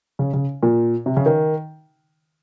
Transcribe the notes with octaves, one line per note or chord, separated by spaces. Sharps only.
C#3
C#3
A#2
C3
C#3
D#3